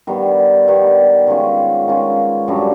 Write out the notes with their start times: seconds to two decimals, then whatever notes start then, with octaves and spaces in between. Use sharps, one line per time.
0.07 D#3 G3 B3
0.68 D#3 G3 B3
1.27 D#3 G#3 C#4 F4
1.88 D#3 G#3 C#4 F4
2.48 F#2 D3 G3